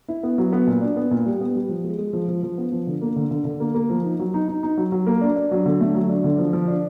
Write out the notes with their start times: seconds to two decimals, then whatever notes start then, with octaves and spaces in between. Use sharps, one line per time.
0.08 E4
0.23 B3
0.38 F#3
0.52 B3
0.67 A#2
0.82 D4
0.96 B3
1.11 A#2
1.26 G3
1.41 B3
1.55 G3
1.69 F3
1.84 G#3
1.98 G#3
2.13 F3
2.28 F3
2.43 F3
2.58 B3
2.72 F3
2.87 D3
3.01 A#3
3.16 D3
3.31 D3
3.45 D3
3.60 A#3
3.75 A#3
3.90 F3
4.04 D#4
4.19 F#3
4.34 D#4
4.48 D#4
4.63 D#4
4.77 F#3
4.92 F#3
5.07 A#3
5.21 D4
5.36 D4
5.51 F#3
5.66 D3
5.80 A3
5.95 F#3
6.09 D4
6.24 D3
6.38 F3
6.53 F3
6.68 D4